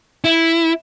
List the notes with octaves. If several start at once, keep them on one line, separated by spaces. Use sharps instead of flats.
E4